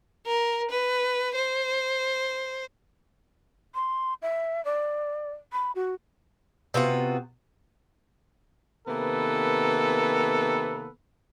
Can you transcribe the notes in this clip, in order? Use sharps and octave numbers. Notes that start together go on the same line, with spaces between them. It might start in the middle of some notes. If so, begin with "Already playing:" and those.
A#4
B4
C5
C6
E5
D5
B5
F#4
C3 B3 F4 F#4
C3 D#3 A#3 B3 A4 B4